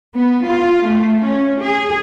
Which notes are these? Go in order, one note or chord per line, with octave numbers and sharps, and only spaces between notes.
B3
F4
A3
C#4
G#4